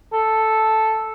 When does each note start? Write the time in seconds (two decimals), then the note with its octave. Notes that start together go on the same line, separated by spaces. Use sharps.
0.13 A4